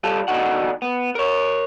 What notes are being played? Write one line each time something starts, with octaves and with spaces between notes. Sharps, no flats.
G3 F4 A4
E2 D3 D4 D#4 F#4 F#5
B3
A#4 C#5